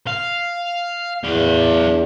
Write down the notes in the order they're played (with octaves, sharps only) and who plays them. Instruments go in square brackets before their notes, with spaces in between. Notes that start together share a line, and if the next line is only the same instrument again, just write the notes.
[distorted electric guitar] F5
[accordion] E2 [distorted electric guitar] D4 F5